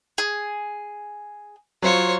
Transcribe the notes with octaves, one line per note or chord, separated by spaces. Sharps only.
G#4
F#3 F4 C5 C#5